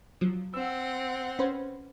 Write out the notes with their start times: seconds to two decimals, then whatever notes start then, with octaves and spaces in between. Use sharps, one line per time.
0.21 F3 F#3
0.54 C4 F#5 E6
1.39 C#4 B4 C5